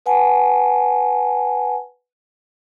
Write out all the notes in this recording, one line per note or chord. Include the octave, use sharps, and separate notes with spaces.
B4 F#5 G#5 A5